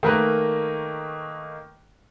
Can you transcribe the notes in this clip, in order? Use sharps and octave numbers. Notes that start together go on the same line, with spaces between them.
D#3 A3 A#3 A#4 B4